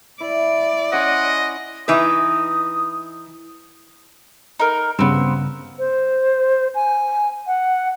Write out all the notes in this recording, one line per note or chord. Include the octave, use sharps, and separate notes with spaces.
E4 D5
C#4 D#5 F#5 G#5 C6
E3 D#4 B4 D#6
D#4 A#4
G2 C#3 B3 C4
C5
G#5
F#5